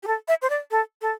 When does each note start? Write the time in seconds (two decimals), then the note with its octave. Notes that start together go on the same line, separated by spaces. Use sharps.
0.03 G4
0.07 A4
0.28 E5
0.42 C5
0.50 D5
0.71 A4
1.02 A4